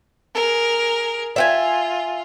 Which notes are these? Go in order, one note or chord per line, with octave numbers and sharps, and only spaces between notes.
G#4 A#4
F4 E5 G5 G#5